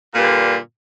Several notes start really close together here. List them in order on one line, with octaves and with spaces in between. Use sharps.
A#2 G2 D3